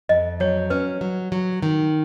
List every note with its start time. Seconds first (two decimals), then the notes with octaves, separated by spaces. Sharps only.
0.09 F2 D#5
0.40 F#3 C#5
0.70 C#4 B4
1.01 F#3
1.32 F#3
1.63 D#3